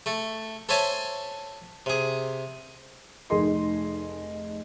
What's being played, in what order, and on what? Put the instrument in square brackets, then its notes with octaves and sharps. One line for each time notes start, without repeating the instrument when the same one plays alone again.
[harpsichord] A3 A4
A4 C5 C#5 E5 G#5 A5
C3 G#4
[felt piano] F1 D#4 G#4 D#5 C6